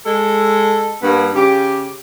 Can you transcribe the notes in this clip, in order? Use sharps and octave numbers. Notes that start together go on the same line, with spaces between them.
G#3 A4
G2 A#3 B3
C#3 G4